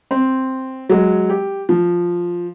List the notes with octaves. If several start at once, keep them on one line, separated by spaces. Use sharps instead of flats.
C4
F#3 G#3
G4
F3